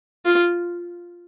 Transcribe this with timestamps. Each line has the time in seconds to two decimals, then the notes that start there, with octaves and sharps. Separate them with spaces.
0.25 F4